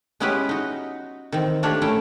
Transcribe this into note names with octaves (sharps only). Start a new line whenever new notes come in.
G#3 B3 C#4 E4 G4 B4
D#4 F#4
D#3 E3 C4
A3 A#3 D4 F4 G4 C#5
A3 C#4 E4 G5